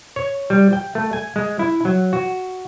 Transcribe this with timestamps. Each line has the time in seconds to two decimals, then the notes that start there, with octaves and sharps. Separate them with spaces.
0.16 C#5
0.50 G3
0.73 G5
0.95 A3
1.13 G#5
1.36 G#3
1.59 E4
1.85 F#3
2.13 F#4